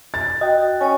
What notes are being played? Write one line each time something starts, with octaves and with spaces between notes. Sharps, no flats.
A6
F#4 D#5 G5
C#4 C#5 G#5